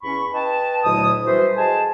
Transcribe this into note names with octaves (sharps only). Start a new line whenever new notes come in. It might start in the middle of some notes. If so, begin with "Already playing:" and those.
E2 C#4 B5 C#6
B4 D#5 G5 A5
D2 A#2 F#3 E4 D#5 D#6
E3 G3 F#4 A4 B4 C5
G#4 D#5 G#5 A5